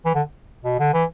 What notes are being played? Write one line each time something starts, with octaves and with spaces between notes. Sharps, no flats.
E3
D3
B2
D3
E3